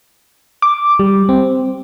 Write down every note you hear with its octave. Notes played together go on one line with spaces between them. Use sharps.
D6
G3
C4